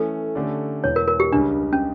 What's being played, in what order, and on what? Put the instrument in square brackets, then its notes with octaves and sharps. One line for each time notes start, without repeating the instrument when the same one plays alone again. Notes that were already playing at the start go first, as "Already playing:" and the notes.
Already playing: [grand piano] E3 A3 C#4 [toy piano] A4
[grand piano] D3 A3 C#4 G4 D5
[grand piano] E1 E2 E3 [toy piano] C#5
[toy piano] A#4
A#4
G4
[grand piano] C#2 C#3 G3 [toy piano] D4
[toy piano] C#4